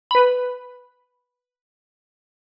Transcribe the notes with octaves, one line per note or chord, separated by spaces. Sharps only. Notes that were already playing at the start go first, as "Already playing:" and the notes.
B4 B5